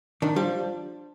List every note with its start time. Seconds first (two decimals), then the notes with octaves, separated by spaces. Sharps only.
0.22 D#3 D4
0.36 F3 G3